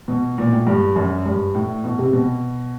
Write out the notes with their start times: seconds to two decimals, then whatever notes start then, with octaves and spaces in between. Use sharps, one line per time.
0.08 B2
0.38 A#2
0.52 A2
0.67 G2
0.96 F#2
1.26 G2
1.55 A2
1.84 B2
1.99 C3
2.13 B2